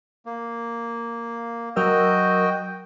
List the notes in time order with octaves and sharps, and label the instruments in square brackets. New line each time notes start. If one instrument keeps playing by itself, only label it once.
[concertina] A#3
[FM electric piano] F#3 A#4 E6 [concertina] F#4 D#5 G5